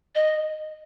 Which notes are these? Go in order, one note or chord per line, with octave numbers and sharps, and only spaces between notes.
D#5